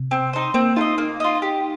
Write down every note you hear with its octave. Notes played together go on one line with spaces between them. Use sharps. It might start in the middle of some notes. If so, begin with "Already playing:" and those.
Already playing: C3
C4
D#4 C5
A#3 C4
D#4 F4 A#4 D#5
A#3
F4 D#5
G4